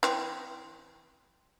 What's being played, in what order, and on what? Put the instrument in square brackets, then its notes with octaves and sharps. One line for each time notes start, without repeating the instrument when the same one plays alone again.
[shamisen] E3 C4